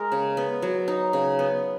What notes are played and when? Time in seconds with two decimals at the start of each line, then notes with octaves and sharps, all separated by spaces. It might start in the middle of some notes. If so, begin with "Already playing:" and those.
Already playing: G#3 A#4
0.12 C#3
0.37 B3
0.62 F#3
0.88 D#4
1.13 C#3
1.39 B3